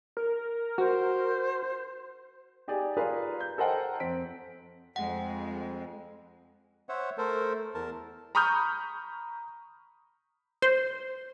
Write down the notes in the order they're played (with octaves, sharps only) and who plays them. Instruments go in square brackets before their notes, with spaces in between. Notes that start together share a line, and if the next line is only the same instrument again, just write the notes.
[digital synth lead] A#4
[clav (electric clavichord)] F#4 [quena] C5
[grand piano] D#4 G4 G#4 D5 G#5
F4 G#4 A#4 B4 D5 F5
G6
A4 A#4 C5 D#5 F#5 G5
F2 C4 B6 D7
[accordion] F2 [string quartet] G#3 [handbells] F#5
[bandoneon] C5 C#5 E5 F#5
A3 A4 A#4 C5
E2 A#4 A5
[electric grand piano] A#5 B5 C#6 D#6 F6 G6
[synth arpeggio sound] C5